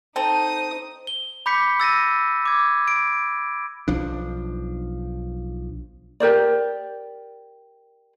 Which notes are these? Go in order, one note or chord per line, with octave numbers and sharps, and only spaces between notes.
C4 D#4 A4 C5 A5 D#6
G7
B5 D6 G6 B6 C#7
E6 A6 A#6 D#7
D6 G#6
D7
B1 F3 D4
G4 A#4 C5 D5